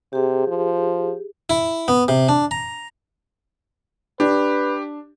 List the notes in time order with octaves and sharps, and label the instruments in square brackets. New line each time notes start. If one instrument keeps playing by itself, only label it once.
[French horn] C3 [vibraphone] G4 G#4
[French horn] F3
[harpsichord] E4
B3
C3
D4
A#5
[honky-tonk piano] D4 [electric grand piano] G4 [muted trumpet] B4